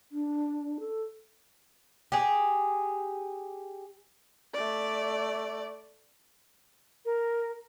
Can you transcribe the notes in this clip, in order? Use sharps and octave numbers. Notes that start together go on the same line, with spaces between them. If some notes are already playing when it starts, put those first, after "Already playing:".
D4
A4
G4 G#4
A3 D5
A#4